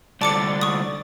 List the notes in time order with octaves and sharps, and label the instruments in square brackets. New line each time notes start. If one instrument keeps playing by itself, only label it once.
[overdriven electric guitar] C2 D3 [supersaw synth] D5 A6 [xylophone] A5 D6 C#7
[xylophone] C#6 D#6